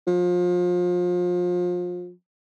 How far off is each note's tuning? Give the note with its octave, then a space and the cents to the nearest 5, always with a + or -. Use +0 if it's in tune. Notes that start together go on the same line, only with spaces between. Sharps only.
F3 +30